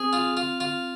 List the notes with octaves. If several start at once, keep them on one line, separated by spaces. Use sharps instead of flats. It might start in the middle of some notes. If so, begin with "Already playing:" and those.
Already playing: C4 G#4
F4
F4
F4